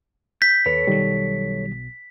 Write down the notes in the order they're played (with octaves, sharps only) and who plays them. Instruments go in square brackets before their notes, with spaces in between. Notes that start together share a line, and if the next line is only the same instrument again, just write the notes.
[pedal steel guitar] G6 [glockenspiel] B6
[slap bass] D#2 [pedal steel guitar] A4 C#5 [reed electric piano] B4
[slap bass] B1 F#3 [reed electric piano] D#3 G3